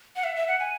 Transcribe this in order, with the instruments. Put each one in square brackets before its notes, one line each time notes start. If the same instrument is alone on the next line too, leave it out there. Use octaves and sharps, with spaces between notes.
[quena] F#5
E5
E5
F#5
G#5